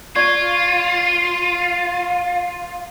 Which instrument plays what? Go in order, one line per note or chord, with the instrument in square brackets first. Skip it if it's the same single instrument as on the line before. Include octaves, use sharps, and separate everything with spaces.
[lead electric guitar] F4 [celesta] D5 C#6 G#6